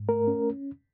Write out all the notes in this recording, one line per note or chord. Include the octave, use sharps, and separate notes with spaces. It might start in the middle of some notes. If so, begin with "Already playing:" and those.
Already playing: G#2
A3 A#4
C#4